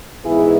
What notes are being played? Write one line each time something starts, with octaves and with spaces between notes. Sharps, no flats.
G#2 E3 B3 E4 G#4